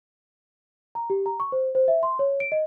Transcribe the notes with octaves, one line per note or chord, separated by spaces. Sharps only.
A#5
G4
A#5
C#6
C5
C5
E5
C6
C#5
D7
D#5